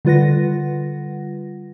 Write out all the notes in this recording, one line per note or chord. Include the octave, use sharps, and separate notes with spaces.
D3 G3 F4 B4 F#5 A#6